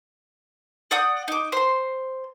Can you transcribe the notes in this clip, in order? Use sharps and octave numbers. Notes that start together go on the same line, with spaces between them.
D5 F#5 D#6 G6
D#4 D6
C5 C6